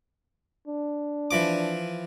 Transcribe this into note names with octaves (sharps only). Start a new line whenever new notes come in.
D4
E3 F3 D6